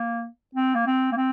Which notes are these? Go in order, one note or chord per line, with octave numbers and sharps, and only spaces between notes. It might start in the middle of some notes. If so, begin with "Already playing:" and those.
Already playing: A#3
C4
A#3
C4
A#3
C4